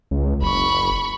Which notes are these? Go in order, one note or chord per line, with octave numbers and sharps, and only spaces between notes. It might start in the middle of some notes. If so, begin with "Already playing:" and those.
C#2
F#1 B5 C#6